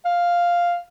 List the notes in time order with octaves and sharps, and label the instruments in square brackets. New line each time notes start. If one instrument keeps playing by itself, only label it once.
[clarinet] F5